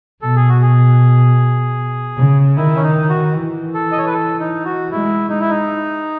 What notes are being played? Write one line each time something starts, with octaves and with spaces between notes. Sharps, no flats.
B2 A4
G#4
F#4
G#4
C#3
D#3 E4
C#4
D#4
F#4
E3
A4
D#5
C#5
B4
A4
D#4
F#4
G#3 E4
G#3 D#4
E4
D#4